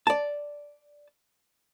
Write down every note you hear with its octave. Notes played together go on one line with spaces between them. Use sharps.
D5 A5